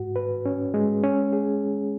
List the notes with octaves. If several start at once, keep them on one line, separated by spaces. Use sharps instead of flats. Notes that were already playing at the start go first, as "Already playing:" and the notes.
Already playing: G#2 F#4
B4
C#4
G#3
C#4
G#4